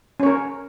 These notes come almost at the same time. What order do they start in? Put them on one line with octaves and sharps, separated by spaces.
C#4 C#5 A#4